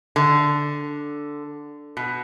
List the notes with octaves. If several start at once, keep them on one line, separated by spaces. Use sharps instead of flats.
D3
B2